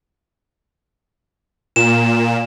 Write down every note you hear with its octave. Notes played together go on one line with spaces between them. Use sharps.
A#2 E7